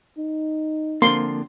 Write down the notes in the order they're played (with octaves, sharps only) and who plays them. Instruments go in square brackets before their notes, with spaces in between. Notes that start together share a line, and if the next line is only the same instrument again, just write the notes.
[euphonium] D#4
[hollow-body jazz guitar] D3 F3 C4 [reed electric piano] A#3 [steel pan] C6